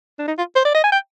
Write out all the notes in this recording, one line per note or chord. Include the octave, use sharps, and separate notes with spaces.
D4
D#4
F4
C5
D5
D#5
G#5
G5